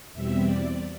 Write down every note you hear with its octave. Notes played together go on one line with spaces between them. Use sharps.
E2 B2 G3 C4 E5
D5